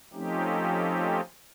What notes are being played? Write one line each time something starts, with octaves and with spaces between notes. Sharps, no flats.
F3 A3 C4 C#4 D#4 G4